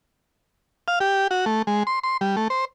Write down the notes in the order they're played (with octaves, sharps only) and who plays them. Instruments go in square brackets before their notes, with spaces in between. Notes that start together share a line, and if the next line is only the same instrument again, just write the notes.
[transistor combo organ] F5
G4
F#4
A3
G#3
C6
C6
G3
A3
C5